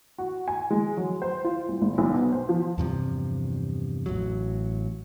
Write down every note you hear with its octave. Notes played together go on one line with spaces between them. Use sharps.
F#4
G#5
G#3
F#3
C5
F4
C2
G#1
B1
B2
C5
F3
E2 G2 C3 F3
A1 F#3